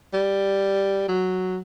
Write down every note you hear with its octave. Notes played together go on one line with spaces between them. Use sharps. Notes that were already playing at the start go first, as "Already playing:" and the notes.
G3
F#3